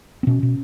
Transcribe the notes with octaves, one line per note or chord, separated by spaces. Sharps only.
C4
B2 C#4
B2